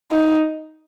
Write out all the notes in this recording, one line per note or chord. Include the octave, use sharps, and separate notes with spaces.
D#4